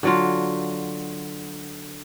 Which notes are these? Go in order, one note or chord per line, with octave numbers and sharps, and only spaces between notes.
D3 F#3 F4